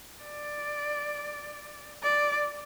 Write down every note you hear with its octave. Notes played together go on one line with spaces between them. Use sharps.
D5
D5